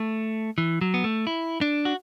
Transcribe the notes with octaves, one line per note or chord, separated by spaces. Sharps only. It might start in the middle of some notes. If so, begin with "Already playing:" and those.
Already playing: A3
E3
F#3
B3
A3
E4
D4
F#4